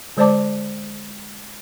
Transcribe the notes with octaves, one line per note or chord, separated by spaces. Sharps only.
D3 G#3 C5 D5 A5 D6